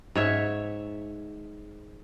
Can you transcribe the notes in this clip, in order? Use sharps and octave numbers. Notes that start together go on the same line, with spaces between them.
G#2 C#5 E5